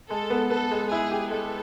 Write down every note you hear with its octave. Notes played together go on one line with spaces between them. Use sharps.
G#3 A4
B3
B3 A4
G#3
E4 G#4
G4
G#3 A4